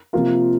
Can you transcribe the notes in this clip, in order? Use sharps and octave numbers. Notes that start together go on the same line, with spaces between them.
C3 F3 A#3 F4 A#4